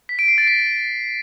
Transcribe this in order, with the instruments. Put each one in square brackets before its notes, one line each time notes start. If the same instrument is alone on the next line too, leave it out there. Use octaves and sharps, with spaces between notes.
[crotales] B6
D7
C7
A6
B6